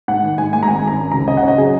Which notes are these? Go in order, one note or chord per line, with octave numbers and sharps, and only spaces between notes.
G#2 F#5
D#3
G#2 G#5
G#3 G#5
A#5
G#1 G#5
G#1 A#5
C#4
C#2 A#5
C#3 D#5
F#5
C#4
D#5
F#3 G#4